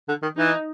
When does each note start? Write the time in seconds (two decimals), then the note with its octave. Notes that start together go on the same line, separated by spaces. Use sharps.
0.08 D3
0.22 D#3
0.37 E3 D#4